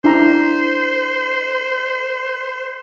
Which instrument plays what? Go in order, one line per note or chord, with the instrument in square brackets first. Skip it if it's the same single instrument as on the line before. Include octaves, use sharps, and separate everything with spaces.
[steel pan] D4 E4 A#5 [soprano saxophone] C5